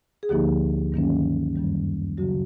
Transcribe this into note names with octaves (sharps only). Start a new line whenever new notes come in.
G#4
D2 D3 F3 A#3 D#4 G4
G2 D#3 F#3 A#3 C#4
F#2 D#3 G3
C#3 F#3 F#4